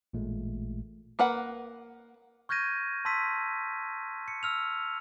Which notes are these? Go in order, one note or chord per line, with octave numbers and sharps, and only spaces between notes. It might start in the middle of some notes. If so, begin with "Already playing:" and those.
A1 A#2 G#3 A3
A#3 A#4 B4 F#5
C#6 F6 G6 G#6 A#6 D#7
A5 C6 E6 B6 D#7
C#7
E6 F6 F7